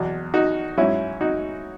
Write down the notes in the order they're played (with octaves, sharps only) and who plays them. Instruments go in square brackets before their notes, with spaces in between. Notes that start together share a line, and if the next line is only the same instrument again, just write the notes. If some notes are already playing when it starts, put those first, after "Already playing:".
Already playing: [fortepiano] E2 B2 F#3
D#4 F#4
G#2 F#3 C#4 E4
D#4 F#4